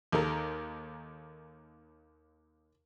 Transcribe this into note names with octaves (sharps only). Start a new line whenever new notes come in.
D#2 D#3 A4 A#4